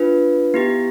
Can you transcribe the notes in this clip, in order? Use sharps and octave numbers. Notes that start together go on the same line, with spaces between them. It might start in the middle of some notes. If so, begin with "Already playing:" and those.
Already playing: D4 F4 B4
B3 E4 G4